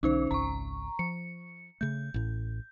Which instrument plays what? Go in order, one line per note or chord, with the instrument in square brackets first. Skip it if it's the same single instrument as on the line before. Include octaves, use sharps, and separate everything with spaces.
[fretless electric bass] B1 D3 [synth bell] C#4 D#4 C5
[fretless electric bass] G#1 C#2 [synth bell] A#5 C#6
[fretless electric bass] F3 [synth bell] C#7
[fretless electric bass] C#3 A3 [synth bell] G6
[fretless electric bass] A1 A2